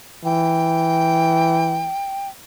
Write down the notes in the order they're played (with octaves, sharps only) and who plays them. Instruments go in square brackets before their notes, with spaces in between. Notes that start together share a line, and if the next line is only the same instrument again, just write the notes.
[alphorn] E3 [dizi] G5